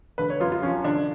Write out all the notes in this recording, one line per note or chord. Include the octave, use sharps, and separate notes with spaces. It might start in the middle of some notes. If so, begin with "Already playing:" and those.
D3 B4
C#5
F#2 F4
F4
F3 C#4
D3 D4